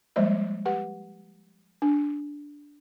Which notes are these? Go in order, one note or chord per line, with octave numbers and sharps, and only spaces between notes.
F3 G3 G#3 A#3 C5 E5
G4 B4 F#5
D4